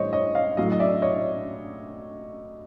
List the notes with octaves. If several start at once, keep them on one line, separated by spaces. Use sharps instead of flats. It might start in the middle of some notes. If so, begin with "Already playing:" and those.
Already playing: A2 E3 G3 C5 C#5 D#5
C#5 D#5
D#5 F5
A2 F#3 D#5 F5
D#5
D5 E5
C#5 D#5